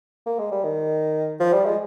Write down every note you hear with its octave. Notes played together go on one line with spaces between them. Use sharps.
A#3
G#3
G3
D#3
F3
G3
G#3